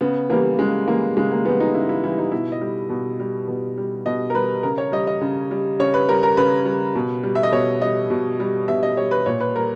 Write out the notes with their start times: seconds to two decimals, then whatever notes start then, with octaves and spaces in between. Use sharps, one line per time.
0.01 C#3 B3
0.30 E3 G3 A#3
0.58 C#3 G#3
0.88 E3 G3 A#3
1.17 C#3 G#3
1.32 A#3
1.45 E3 G3 B3
1.60 D#4
1.75 C#3 E4
1.89 E4
2.03 E3 G3 E4
2.18 D#4
2.32 B2 E4
2.52 D#5
2.61 G3
2.90 B2
3.20 G3
3.48 B2
3.77 G3
4.06 B2 D#5
4.30 A#4
4.34 G3 B4
4.63 C#3 A#4
4.78 C#5
4.92 G3 D#5
5.07 D#5
5.21 C#3
5.51 G3
5.79 C#3 C#5
5.94 B4
6.09 G3 A#4
6.23 A#4
6.37 C#3 B4
6.65 G3
6.96 B2
7.23 G3
7.35 E5
7.43 D#5
7.52 B2 C#5
7.82 G3 D#5
8.10 B2
8.40 G3
8.68 B2 E5
8.83 D#5
8.97 G3 C#5
9.11 B4
9.26 A#2 C#5
9.40 B4
9.55 G3 A#4